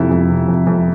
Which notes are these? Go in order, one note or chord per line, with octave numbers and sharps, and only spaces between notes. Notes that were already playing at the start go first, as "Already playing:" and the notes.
Already playing: F2 C3 E4
F2
C3
F2
F2